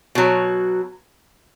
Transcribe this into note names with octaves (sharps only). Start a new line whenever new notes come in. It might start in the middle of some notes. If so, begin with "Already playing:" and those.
B2 F#3